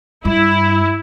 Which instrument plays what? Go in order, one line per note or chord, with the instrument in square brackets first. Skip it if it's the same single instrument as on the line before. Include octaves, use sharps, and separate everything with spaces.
[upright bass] G2 [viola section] E4